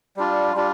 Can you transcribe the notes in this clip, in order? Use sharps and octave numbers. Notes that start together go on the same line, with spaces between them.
G3 D4 F4
G3 D4 F4